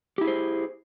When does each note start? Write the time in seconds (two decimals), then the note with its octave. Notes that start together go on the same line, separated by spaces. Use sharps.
0.18 G4
0.21 E4
0.24 G#4
0.27 C5